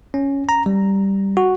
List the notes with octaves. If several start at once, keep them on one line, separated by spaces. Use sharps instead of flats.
C#4
A#5
G3
F#4